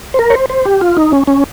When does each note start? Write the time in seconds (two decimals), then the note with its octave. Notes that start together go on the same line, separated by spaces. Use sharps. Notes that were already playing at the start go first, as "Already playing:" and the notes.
0.14 C5
0.19 A#4
0.30 C#5
0.34 C5
0.50 C5
0.65 G4
0.81 F4
0.97 D#4
1.12 C#4
1.27 C#4